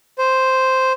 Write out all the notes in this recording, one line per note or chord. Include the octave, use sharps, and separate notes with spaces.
C5